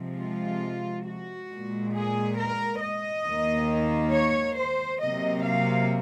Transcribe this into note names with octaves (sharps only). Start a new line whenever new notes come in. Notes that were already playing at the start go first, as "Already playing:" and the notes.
Already playing: C3 F3 G#3
F4
F#4
A#2 G#3
G#4
A#4
D#5
D#2 D#3 A#3
C#5
C5
C3 F#3 A#3 D#5
F5